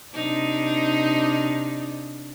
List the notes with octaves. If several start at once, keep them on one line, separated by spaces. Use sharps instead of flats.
C3 D4 D#4